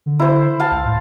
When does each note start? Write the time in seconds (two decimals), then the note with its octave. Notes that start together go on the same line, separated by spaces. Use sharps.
0.06 D3
0.19 E4 C5
0.59 F5 A5
0.71 C#2
0.85 A2